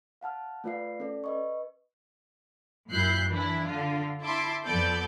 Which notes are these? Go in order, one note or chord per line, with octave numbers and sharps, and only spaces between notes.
F5 F#5 A5 F6
A3 F4 B4 D5 F5 C7
C#4 A4 D5
B4 D#5 C#6
F#2 A#2 E4 F#6 G6 C7
E3 D4 E4
D3 F4
E4 E5 A5 C6 D6
F2 F3 B3 A4 D5 G6